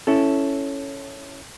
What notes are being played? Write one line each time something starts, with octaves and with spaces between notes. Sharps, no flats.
C#4 E4 A4